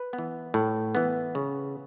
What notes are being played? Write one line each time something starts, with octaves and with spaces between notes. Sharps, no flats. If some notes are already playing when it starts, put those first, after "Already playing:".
Already playing: B4
B3
E3
A2
E3 B3
C#3